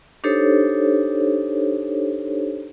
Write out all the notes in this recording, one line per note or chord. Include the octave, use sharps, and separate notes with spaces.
D4 D#4 G4 A4 C5 C#5